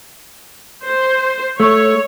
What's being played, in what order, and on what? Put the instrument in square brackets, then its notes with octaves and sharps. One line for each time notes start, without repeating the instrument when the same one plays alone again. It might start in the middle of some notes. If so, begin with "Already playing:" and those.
[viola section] C5
[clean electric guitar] A3 [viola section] C#5